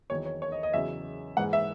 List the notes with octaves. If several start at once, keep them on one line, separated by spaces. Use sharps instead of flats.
E2 D#3 F#3 C#5
C#5
C#5
D#5
D#5
E2 C#3 F#3 E5
G#2 E3 G#3 F#5
E5